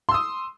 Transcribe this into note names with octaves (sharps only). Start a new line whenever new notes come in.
C6 D#6 E6